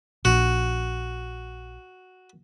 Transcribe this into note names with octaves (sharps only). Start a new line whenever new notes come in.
A#1 F#4